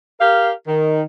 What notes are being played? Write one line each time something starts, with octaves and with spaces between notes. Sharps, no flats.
G4 A#4 F5
D#3